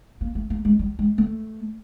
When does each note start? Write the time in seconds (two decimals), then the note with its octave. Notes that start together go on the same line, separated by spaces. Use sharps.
0.21 A#3
0.35 A3
0.50 A3
0.65 G#3
0.79 G3
0.99 G#3
1.18 A3